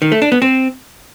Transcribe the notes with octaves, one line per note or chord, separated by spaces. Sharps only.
D#3
A3
D4
B3
C4